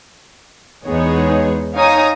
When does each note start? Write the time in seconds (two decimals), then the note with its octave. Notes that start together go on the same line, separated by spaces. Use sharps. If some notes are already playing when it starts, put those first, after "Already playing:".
0.87 E2 G#3 B3 D#4 G#4 C#5
1.75 D#4 C#5 F5 G#5 A#5 D#6